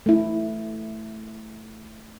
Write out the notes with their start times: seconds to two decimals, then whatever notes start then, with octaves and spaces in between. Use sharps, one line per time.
0.06 A3 E4